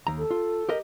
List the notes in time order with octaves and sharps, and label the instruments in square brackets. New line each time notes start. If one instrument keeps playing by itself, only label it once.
[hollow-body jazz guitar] D#2 A#5
[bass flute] A4
[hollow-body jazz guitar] F4
G4 A#4 D#5